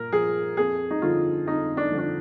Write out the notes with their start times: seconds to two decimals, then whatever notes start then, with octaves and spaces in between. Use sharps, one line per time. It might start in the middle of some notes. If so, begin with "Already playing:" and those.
Already playing: A#2 A#4
0.13 F3 G#4
0.57 F2 G#4
0.91 D#4
1.02 D3 F3 F4
1.47 F2 D#4
1.77 D4
1.92 D3 F3
1.98 D4